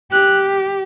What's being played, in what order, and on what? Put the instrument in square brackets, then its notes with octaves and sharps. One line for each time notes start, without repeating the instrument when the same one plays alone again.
[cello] G4 [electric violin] F#6